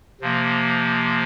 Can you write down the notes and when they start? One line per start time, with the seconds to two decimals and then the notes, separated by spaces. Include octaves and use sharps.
0.21 C3 F3 A#3